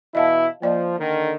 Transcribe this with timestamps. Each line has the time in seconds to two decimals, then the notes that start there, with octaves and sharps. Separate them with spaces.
0.15 B2 E3 E4 D#5 F5 A5
0.62 F3 A#3 D5 D#5
0.99 D3 D#3